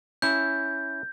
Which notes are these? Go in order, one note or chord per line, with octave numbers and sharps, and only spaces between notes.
C#4 E4 G6